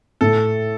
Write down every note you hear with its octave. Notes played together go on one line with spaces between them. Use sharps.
A2 A4